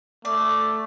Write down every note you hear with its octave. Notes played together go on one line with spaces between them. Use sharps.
A3 D5